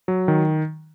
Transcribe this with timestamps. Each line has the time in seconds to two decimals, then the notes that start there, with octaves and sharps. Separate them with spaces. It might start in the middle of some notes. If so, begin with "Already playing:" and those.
0.08 F#3
0.28 D#3